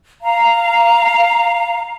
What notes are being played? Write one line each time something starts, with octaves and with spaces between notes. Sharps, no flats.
F5 A#5